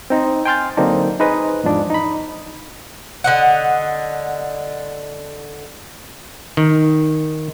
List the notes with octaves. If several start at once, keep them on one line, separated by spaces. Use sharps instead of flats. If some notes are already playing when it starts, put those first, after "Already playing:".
C4 D#4
G5 G#5 C6 F6 G6 A6
D3 F#3 A#3 C4 D4 D#4
D#4 G#4 B4 C5 D#5
E2 G#2 F3 D4
D#4 B5
D3 D#5 F#5
D#3